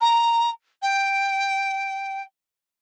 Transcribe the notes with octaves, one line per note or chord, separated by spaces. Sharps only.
A#5
G5